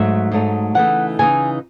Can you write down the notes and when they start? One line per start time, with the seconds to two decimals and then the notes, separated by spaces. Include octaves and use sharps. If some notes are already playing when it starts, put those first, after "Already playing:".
Already playing: G#2 F#3 A3 D#4 E5
0.32 G#2 F#3 A3 D#4
0.75 C#3 E3 A3 D#4 F#5
1.19 C#3 E3 A3 D#4 G#5